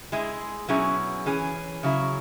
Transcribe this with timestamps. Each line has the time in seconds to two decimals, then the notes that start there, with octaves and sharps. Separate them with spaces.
0.12 G#3 E4 G#4
0.68 B2 F#3 C#4 E4 G#4
1.26 E3 C#4 G#4
1.83 C#3 F#3 E4